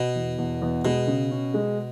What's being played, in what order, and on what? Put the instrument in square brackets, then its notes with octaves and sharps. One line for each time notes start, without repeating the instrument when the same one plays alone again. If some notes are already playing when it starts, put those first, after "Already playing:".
Already playing: [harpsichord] B2
[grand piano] E2
E2
E2
[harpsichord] B2 [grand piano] G#3
[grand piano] C#3
C#4
G#3